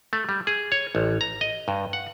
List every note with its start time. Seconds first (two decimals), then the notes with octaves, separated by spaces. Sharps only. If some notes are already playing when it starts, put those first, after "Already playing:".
0.13 A3
0.29 G3
0.47 G#4
0.72 C#5
0.95 A1
1.21 A#5
1.41 D#5
1.68 G2
1.93 F#5